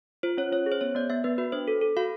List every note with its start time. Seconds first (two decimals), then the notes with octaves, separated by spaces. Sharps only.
0.23 F4 C5
0.38 C#4 C#5
0.52 C#4 C#5
0.66 G#4
0.72 C5
0.81 B3 C#5
0.95 B3 D5
1.10 B3 E5
1.24 B3 B4
1.38 F#4 B4
1.52 D4 C5
1.68 A4
1.81 A4
1.97 F#4 F5